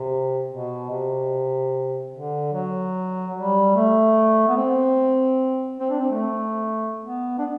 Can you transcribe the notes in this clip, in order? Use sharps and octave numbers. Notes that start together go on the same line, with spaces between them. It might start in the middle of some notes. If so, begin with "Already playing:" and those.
Already playing: C3
B2
C3
D3
F#3
G3
A3
B3
C4
C4
D4
C4
A3
B3
D4